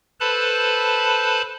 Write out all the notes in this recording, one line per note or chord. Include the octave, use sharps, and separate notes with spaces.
A4 B4 C5 A5 B5